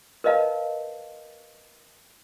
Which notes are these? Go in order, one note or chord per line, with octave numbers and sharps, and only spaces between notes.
A#4 B4 D#5 F5 A5